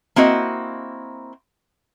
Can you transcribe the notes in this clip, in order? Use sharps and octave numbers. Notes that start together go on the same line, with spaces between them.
A#3 C4 E4 F#4 D#5